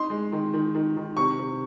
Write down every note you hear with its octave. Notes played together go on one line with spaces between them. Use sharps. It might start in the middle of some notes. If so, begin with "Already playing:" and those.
Already playing: D#4 C6
G#3
D#3
D#3
D#3
D#3
C3 C#6
C3